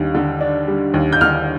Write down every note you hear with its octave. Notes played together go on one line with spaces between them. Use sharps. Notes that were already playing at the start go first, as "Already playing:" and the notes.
Already playing: D#2 D3 G3
D3
D4
G3
D#2
G6
D3 F6